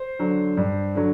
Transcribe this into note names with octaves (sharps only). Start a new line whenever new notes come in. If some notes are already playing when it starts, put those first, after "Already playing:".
Already playing: C5
D3 F#3
G2
D3 F#3